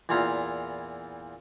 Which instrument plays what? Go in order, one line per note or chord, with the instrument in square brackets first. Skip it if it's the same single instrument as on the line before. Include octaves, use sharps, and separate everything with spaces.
[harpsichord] E2 A#2 E4 F4 A#5